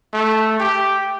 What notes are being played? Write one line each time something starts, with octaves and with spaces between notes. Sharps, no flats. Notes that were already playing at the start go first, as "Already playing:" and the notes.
A3
G4